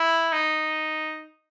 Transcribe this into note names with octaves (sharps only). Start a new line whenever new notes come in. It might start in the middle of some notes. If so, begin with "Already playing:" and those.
Already playing: E4
D#4